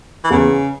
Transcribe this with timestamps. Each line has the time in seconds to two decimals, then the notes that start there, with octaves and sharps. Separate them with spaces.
0.24 E3
0.31 E2 C#3